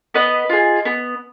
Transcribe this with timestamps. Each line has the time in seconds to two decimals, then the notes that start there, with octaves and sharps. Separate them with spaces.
0.14 B3 B4 D#5
0.50 F4 G#4
0.85 B3